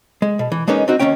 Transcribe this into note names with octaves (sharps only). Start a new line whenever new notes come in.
G#3
B2
E3
G#3 A#3 B3 C#4 D#4
C4 D#4 F#4
D#2 F#3 A#3 C#4 G5